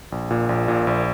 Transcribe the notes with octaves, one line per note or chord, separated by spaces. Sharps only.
A#1
A#2
A#1
A#2
A#1